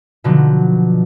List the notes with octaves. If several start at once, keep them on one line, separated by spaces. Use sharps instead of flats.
B2 D3 F3 F#3